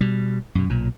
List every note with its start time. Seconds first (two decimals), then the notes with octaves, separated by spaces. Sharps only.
0.01 B2 G3
0.55 F#2 B2
0.69 B1 A#2